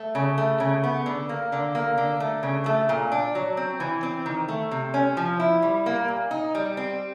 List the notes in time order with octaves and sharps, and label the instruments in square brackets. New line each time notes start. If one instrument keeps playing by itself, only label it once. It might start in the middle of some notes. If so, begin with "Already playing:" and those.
Already playing: [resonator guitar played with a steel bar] A3
C#3
A3
C#3
B3
D3
A#3
D3
A#3
D3
A3
C#3
A3
A#2
D4
F#3
C4
E3
C4
D#3
A3
C3
C#4
F3
E4
G3
A#3
A#2
D#4
G3
C4